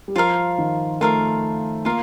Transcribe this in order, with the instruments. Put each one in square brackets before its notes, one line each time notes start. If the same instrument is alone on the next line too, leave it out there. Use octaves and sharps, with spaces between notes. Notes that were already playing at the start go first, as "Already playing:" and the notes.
[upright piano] G3
[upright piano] F3 [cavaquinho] F4 A#4 F5
[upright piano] D#3
[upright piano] A3 [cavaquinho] F4 A#4 F5
[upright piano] A#3 [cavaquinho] F4 A#4 F5